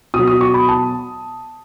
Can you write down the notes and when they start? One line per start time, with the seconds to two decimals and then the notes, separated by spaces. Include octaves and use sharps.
0.14 B2 D#6
0.19 F#3
0.28 D#6
0.41 C#6
0.54 B5
0.69 A5